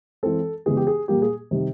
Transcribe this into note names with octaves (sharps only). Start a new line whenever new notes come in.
E3 G#3 C4 A4
C#3 E3 G#3 B3 G#4
G4
G#4
A#2 G3 A#3 G4
G#4
C3 D#3 G3